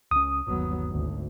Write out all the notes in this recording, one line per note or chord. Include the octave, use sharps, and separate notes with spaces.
C#2 C#4 D#6
G1 D#2 F#3 B3
G#1 D2